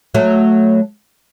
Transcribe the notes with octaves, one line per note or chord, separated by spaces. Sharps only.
F#3 A3